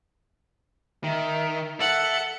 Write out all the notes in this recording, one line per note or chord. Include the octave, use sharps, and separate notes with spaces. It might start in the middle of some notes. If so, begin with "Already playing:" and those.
D#3 E5
A4 E5 F#5